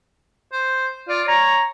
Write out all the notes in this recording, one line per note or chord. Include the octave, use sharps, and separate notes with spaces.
C5
F4 D5
C#5 A#5